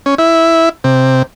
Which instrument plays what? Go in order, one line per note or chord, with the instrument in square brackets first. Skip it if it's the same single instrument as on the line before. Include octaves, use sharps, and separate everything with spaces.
[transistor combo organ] C#4
E4
C3